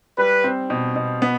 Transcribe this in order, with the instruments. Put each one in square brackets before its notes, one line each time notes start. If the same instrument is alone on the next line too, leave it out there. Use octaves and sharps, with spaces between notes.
[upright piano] G3 [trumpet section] B4
[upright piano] C4
B2
B2
B3